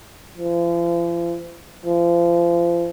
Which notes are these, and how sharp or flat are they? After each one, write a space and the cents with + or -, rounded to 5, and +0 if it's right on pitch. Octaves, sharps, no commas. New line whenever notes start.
F3 -40
F3 -30